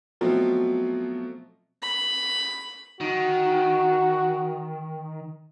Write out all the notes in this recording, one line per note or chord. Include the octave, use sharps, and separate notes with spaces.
B2 F3 F#3 A3 C4
B5
D#3 F#4